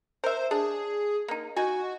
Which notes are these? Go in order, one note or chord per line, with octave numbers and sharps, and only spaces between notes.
A#4 C5 E5
D4 G#4
A#3 D#4
D#4 F#4 G#5